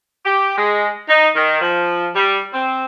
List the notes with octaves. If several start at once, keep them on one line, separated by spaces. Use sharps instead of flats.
G4
G#3
D#4
D#3
F3
G3
C4